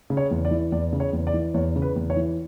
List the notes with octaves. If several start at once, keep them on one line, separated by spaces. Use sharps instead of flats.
C#3
C#5
E2
D5
E3
E2 D5
C#3
C#5
E2
D5
E3
E2 C#5
C#3
B4
E2
C#5
E3